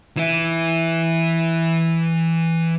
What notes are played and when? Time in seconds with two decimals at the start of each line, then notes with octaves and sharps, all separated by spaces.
0.17 E3 E4